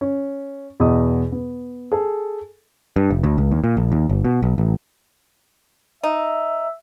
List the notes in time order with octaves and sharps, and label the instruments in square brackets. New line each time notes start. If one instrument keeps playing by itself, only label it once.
[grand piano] C#4
E2 B2 D#5 D#6
B3
G#4 A4
[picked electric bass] G2
F1
D2
C#2
D#2
A#2
A#1
D#2
G1
B2
B1
A1
[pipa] D#4 [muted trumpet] E5